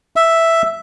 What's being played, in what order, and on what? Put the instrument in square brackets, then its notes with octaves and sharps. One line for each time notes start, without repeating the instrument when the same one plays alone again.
[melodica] E5